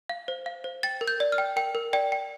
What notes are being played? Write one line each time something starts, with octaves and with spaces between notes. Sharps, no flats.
F5
C5
F5
C5
G5 A6
A#4
G6
D5
F6
G5
A#4 G5
A#4
D5 G5
G5